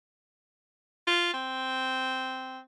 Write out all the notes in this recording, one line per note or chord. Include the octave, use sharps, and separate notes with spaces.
F4
C4